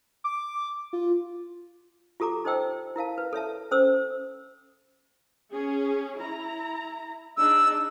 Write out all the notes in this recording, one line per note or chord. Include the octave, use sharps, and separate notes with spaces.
D6
F4
F4 G4 A4 A#5 D6
D#4 A4 C5 D#5 G5 E6
E4 A#4 F5 A5
B4
A4 C#5 E5 A5
C#4 A4 C5 D#6 E6
C#4 G#4
E4 A#5
D4 D#4 G#4 E6